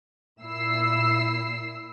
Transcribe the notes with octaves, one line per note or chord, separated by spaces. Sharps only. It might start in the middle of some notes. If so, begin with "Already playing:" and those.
A#2 E4 E6 C7